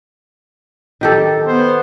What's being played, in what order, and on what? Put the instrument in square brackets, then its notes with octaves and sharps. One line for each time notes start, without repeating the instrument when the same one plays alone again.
[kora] D#3 G4 A4
[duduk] B3 [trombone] C5